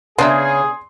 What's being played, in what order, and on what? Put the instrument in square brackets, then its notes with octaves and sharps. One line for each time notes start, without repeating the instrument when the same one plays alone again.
[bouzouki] C#3 [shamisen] B3 D4 E5 [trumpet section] G#4 [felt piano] C6